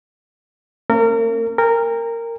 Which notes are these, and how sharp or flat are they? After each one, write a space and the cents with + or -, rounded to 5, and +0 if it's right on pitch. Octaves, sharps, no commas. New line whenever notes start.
A#3 -45 C#4 -45 A#4 -30
A#4 -15 G5 +40